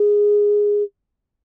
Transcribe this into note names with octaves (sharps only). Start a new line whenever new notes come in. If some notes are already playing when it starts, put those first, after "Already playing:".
Already playing: G#4